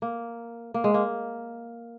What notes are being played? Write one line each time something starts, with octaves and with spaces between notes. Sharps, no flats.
A#3
A#3
G#3
A#3